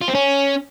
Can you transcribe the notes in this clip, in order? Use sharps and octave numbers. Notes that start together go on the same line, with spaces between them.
F4
C4
C#4